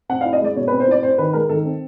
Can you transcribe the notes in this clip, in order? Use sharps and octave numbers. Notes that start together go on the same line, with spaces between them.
C4 F#5
E4 F5
D#5
G#3 D5
B2 C#5
C4 B4
C5
E4 D5
C4 C5
D#3 B4
G#3 A#4
D#3 A4
C4